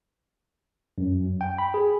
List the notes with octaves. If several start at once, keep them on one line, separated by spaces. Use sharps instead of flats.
F#2
G5
B5
G#4